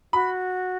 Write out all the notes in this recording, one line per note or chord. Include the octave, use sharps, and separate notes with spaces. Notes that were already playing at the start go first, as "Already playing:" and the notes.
F#4 B5